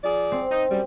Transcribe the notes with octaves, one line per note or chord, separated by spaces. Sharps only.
F3 G#4 D5
C4
D#4
F#2 G3